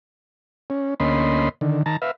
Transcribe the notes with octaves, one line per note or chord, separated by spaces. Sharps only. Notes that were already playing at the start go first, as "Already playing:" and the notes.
C#4
D2 A#3 C#4 D#5 B5 C6
D3 D#3
D#3 A5 A#5
B4 E5 F5